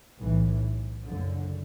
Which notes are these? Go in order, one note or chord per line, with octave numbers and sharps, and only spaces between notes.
B1 A2 E3
F#1 F#2 D3